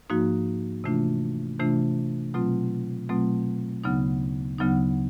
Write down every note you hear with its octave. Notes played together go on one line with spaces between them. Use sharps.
G#2 F3 A#3 D#4 F#4
C3 E3 A3 D4 F4
C3 E3 A3 D4 F4
B2 F#3 A3 C4 F4
B2 F#3 A3 C4 F4
D2 C#3 F#3 B3 D#4
D2 C#3 F#3 B3 D#4